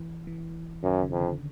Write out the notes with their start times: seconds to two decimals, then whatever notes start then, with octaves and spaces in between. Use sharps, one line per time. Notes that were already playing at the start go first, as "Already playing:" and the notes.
Already playing: E3
0.27 E3
0.83 F#2 D#3
1.02 C#3
1.11 F2
1.20 D3